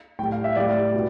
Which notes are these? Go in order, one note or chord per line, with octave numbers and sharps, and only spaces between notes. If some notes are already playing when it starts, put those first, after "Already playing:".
A2 G3 G5
F5
E5
A2 G3 D5
B2